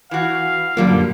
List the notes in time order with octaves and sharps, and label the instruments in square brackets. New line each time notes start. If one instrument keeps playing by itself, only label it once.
[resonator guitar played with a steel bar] E3 F#4 [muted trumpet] F5
[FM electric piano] F#2 A#2 [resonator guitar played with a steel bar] D3 G3 A#3